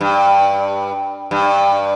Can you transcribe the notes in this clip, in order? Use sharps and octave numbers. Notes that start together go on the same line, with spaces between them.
G2
G2